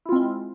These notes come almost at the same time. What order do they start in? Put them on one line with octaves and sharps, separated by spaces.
E4 F4 C4 G#3